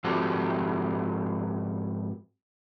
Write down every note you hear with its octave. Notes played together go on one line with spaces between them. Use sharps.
G#2 F3 C4 F#4 G4 A4